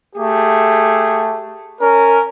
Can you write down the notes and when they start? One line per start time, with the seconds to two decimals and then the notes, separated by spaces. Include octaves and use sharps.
0.16 A3 G4 G#4
1.81 C#4 A#4